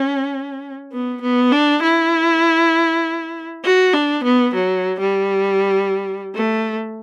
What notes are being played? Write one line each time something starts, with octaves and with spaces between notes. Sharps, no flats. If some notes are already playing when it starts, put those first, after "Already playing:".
Already playing: C#4
B3
B3
D4
E4
F#4
D4
B3
F#3
G3
A3